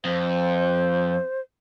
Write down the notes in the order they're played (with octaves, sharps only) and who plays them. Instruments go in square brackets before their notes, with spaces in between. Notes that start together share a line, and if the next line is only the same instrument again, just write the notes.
[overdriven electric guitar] F2 [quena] C5